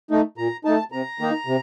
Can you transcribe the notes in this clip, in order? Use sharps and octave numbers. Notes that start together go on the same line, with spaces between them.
A3 D#4
A#2 A#5
A3 D#4 A5
C3 A#5
D#3 A#3 D#4
C3